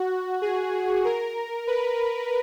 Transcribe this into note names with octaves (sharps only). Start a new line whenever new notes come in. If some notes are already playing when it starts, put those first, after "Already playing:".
Already playing: F#4
G#4
A#4
B4